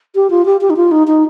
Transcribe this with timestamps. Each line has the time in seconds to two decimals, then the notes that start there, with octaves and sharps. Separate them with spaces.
0.15 G4
0.30 F4
0.46 G4
0.61 G4
0.70 D#4
0.77 F4
0.91 D#4
1.07 D#4